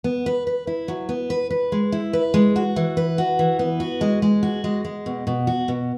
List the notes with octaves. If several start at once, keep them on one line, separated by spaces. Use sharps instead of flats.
B3
B4
B4
E4
F#3
B3
B4
B4
G#3
E4
B4
G#3
F#4
E3
B4
F#4
E3
B3
F#4
G#3
G#3
F#4
G#3
G#3
B2
B2
F#4
B2